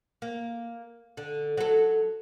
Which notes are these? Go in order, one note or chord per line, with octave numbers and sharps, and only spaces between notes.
A#3
D3
F#3 A4